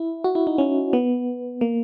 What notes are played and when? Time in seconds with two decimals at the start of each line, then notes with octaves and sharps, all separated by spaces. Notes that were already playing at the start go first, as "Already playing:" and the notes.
Already playing: E4
0.24 F#4
0.35 E4
0.47 D#4
0.58 C#4
0.93 B3
1.61 A#3